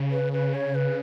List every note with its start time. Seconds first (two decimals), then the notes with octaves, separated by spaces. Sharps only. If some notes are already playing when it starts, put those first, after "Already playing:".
Already playing: C#3
0.11 B4
0.32 B4
0.54 C#5
0.75 B4